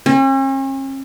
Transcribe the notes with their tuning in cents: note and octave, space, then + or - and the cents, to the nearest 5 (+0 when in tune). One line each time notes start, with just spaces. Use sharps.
C#4 -45